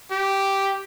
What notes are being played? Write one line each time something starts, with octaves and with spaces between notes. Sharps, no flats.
G4